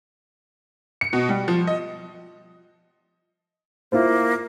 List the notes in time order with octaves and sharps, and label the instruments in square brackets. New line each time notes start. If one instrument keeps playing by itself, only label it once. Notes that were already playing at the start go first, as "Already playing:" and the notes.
[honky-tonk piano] C#7
B2
G3
F3
D#5
[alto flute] A#3 [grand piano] E4 F4 C5